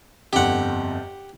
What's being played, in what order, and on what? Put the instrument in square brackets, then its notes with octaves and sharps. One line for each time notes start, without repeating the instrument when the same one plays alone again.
[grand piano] G1 F2 [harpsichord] G4 F#5